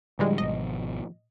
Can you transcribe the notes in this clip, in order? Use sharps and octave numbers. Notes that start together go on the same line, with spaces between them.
A2 D3 E3 F3 G3 G#3
G#1 B2 F3 D#5